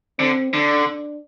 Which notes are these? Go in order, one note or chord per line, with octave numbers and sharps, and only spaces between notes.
D3 C4
D3 D4
D4